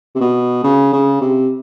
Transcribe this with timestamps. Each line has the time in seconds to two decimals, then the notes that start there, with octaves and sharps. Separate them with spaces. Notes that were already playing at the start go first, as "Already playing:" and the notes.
0.15 C3
0.20 B2
0.64 C#3
0.93 C#3
1.21 C3